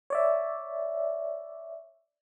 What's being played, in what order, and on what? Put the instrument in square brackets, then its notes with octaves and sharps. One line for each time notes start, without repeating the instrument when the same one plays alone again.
[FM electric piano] C#5 D5 E5